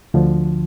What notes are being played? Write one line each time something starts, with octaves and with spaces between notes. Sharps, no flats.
D2 D3 F3